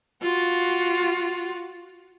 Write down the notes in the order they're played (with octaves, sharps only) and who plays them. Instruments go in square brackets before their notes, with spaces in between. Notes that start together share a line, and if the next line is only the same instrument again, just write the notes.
[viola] F4 F#4